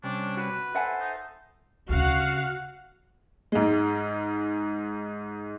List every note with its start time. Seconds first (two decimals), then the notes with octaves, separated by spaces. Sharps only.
0.04 C3 G3 C#4 D4
0.37 F#4 B4
0.75 A4 C5 E5 F#5 G#5
1.00 D#4
1.89 D2 C#3 F#4 F5 F#5
3.52 G#2 G#3